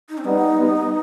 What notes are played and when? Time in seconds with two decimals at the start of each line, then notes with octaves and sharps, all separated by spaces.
0.09 D#4
0.18 C4
0.24 G3 B3 D#4
0.57 G3 B3